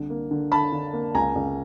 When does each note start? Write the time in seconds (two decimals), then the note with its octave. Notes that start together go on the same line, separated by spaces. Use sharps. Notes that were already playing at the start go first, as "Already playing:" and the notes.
Already playing: C2 D3
0.10 A#3
0.31 D3
0.52 D3 A5 B5
0.72 D3
0.93 A#3
1.14 C#2 G#5 A#5
1.35 C#2